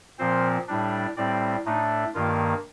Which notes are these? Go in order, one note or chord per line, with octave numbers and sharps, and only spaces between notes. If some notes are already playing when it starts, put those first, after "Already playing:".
A#2 F3 C4 C5
A2 G3 D4
A2 G3 C4 D5
A2 A3 D4 D#4
G2 D#3 A#3 F4